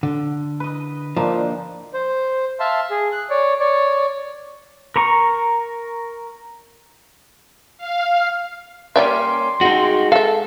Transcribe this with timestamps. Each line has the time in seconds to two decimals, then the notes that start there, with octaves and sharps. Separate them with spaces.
0.03 D3
0.60 B4 D#5
1.16 A#2 F3 D4 D#4
1.94 C5
2.60 E5 F5 A5 C6
2.90 G#4
3.12 F#6
3.30 C#5 D5
3.60 C#5 D5
4.96 A#4 A#5 C#6
7.78 F5
8.96 G3 A#3 C#4 G4 D5 E5 C6
9.61 G#3 D#4 F#4 G5
10.12 A4 E5 F5